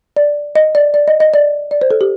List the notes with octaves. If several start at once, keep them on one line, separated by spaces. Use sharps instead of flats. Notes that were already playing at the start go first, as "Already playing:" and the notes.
D5
D#5
D5
D5
D#5
D#5
D5
D5
C5
A4
G4